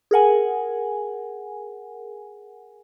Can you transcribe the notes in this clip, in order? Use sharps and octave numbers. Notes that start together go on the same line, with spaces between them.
G#4 A#4 F#5 G#5